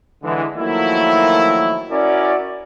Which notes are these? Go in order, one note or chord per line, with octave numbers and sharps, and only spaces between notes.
D3 E3 G#3
D#3 F3 F#3 A3 A#3 E4
C#4 E4 F#4 A#4 D5